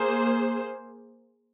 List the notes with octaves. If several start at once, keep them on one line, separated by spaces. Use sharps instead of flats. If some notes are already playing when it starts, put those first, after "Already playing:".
Already playing: A#3 G#4 C5